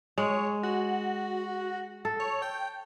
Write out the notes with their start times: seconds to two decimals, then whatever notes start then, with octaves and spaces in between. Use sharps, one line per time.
0.18 G#3 C#5
0.63 F#4
2.05 A4
2.20 C#5
2.42 G5